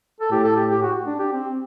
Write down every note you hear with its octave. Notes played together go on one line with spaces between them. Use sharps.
A4
A2 G4
A4
G4
G4
F#4
D4
G4
C4